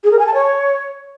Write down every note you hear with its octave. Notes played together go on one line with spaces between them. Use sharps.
G#4
A#4
G#5
A5
C#5